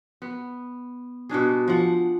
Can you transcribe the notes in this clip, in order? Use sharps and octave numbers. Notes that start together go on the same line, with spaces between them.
B3
B2 G3 D4 G#4
F3 F#5